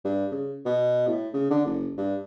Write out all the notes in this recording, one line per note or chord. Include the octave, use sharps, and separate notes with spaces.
G2
C#3
B2
A2
C#3
D3
F#1
G2